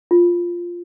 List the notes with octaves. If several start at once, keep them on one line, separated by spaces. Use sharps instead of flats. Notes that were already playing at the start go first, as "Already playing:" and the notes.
F4